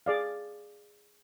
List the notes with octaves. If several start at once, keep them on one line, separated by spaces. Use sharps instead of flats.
G#4 D5 F5